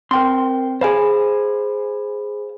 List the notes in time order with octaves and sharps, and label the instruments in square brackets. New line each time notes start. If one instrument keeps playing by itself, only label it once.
[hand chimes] C4 G5 [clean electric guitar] A#4 C6
[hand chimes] G#4 B5 [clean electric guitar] C5 F5 G#5